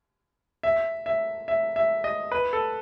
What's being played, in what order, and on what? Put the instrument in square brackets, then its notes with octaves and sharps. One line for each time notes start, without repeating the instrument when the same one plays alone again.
[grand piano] E5
E5
E5
E5
D#5
B4
A4